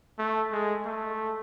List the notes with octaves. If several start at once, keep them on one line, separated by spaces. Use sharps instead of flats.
A3
G#3
A3